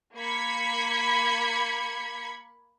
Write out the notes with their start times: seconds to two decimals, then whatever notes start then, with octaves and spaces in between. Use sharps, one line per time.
0.18 A#3 B5 G#6 B6 C#7